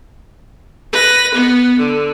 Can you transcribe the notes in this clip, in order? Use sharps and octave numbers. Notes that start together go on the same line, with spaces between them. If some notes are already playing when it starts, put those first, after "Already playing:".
B4 A#6
B3
D3